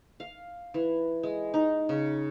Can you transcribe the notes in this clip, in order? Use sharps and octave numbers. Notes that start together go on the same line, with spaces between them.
F5
E3
G#3
D#4
C#3